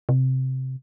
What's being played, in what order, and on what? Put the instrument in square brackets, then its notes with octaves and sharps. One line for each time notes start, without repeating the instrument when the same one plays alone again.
[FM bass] C3